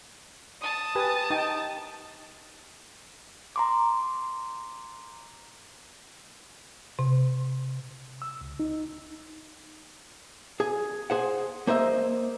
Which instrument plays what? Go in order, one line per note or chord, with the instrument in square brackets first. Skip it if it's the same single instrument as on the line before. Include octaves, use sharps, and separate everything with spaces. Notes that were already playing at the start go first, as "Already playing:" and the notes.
[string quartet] A5 D#6
[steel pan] G4 B4 G#5
D#4 G5
[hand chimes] A#5 C6 D6
[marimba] C3
[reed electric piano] E6
C#2
D#4
[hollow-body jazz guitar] G#4
G#4 C5 F#5
A#3 C5 D#5 E5